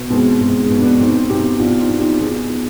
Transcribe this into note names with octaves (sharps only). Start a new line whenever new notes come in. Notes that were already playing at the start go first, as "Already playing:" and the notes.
Already playing: B2
B2 G#3 C4
B2 G#3
G#3
B2
B3 D4
B2 C4 D#4
B2 D#4 G4
B2 D4 F4
C4 D#4
B2
D#4 G4
B2 F4 G#4
B2